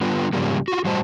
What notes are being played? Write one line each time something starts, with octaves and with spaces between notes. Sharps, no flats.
D3 G3 B3 F4
G#2 C#3 F3 G3 A#3
F4 F#4
A2 G3 F#4 C5 D#5 A5